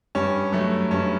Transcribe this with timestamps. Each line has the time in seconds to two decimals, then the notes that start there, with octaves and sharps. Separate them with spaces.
0.15 G2 C#4
0.52 F#3 A3
0.91 G2 C#4